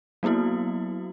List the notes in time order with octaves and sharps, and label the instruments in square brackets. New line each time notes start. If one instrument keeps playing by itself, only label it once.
[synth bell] F#3 A#3 B3 E4 F#4